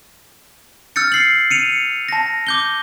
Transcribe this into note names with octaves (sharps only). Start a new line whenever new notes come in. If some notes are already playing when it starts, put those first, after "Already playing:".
E6 F6 G6 A6 C#7
C7 F#7
C#7 D#7 F7
A5 A#6
D6 G6 G7